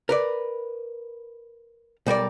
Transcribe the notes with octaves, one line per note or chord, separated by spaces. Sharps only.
A#4 B4 D5
B1 G3 A#4 D5